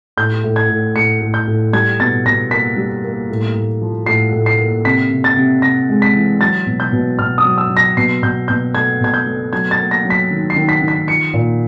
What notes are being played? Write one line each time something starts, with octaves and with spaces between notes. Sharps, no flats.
A2 G6
A2
G#6
A2
A2 C#7
A2
G6
A2
G3 G#6
B2 A6
B2 A#6
A#3 B6
G3
A#3
A2
A2
F3
A2 C7
A2
C7
A#3
C3 B6
C3
A6
C3
C3 A#6
G#3
B6
E3
F#3 A6
B2
G6
B2
B2 F6
D#6
F#3
E6
F#3
A#6
B2 C7
B2 G6
B2 G6
A3 G#6
B2 G#6
G6
A3
F#3 G#6
A6
A#3
A#6
F#3
B6
D#3
C7
D#3
B6
D#3
B6
F3 C#7
A#2